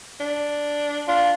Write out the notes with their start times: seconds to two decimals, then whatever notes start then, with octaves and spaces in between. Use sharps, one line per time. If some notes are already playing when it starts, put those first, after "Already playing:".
0.20 D4
1.08 D4 F4